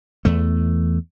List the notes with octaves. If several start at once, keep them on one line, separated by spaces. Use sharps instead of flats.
E2 A3